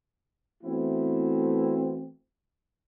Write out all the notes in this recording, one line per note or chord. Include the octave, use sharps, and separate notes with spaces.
E3 A3 B3 C4 E4 F#4